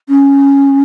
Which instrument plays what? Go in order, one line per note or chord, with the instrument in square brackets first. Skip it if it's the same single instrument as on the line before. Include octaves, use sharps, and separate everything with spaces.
[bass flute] C#4